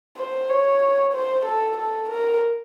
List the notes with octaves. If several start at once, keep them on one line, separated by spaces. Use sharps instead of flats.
C5
C#5
C5
A4
A4
A#4